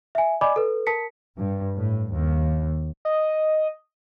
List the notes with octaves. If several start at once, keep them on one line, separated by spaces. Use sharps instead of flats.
E5 G#5
D5 D#5 G#5 B5 D6
A4 B4
A#4 A5 B6 C#7
G2
A2
D#2
D#5